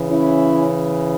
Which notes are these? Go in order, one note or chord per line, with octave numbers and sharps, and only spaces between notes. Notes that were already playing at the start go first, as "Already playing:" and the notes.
Already playing: C#3 E3
C#4 E4